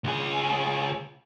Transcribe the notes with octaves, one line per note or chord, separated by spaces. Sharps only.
C#2 G#4